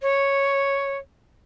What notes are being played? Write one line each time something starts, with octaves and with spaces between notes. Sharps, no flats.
C#5